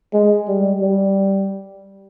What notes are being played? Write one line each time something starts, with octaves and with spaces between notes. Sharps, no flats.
G#3
G3
G3